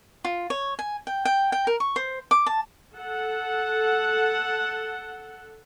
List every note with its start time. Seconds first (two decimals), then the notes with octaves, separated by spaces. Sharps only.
0.25 F4
0.50 C#5
0.79 G#5
1.07 G5
1.25 G5
1.52 G5
1.67 A#4
1.80 C#6
1.96 C5
2.31 D6
2.46 A5
2.95 A4 F#5